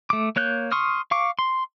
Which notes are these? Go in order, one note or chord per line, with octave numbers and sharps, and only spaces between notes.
A3 D6
A#3 C#5 F#6 G6
C6 C#6 D#6 F6
F5 C#6 D6
C6